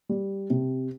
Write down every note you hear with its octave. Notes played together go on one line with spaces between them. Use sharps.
G3
C3